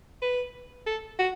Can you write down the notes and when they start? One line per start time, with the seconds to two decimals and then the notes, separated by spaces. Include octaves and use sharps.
0.22 B4
0.86 A4
1.19 F#4